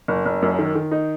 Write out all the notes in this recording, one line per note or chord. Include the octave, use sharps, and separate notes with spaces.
F#1
F#1
F#2
D#3
D#3
D#4